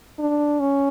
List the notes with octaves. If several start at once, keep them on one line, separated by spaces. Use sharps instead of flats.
D4
C#4